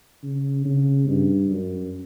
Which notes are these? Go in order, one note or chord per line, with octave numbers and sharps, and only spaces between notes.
C#3
C#3
G2
F#2